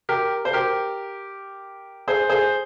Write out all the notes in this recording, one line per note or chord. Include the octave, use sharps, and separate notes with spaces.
G4 A#4
C5
G4 A#4
G#4 C5
G#4 C5